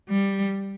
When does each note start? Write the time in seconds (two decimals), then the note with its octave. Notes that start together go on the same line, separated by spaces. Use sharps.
0.09 G3